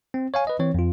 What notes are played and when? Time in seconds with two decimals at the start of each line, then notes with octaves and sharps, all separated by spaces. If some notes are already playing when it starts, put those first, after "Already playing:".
0.14 C4
0.34 C#5 F5 G#5
0.47 B4 D#5
0.59 E3 C4 C#5
0.74 F2 F4